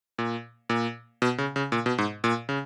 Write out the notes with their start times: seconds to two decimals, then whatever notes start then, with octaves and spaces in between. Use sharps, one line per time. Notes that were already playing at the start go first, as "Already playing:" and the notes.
0.18 A#2
0.70 A#2
1.22 B2
1.38 C#3
1.56 C#3
1.72 A#2
1.86 B2
1.98 G#2
2.24 A#2
2.49 C#3